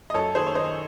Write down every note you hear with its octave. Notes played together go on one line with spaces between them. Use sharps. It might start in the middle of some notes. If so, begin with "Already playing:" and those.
D#5
F#2 A4 C#5
D#3 G#4 C5
C#5
D#3 C5 D#5